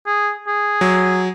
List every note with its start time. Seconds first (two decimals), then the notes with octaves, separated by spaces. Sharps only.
0.07 G#4
0.48 G#4
0.81 F#3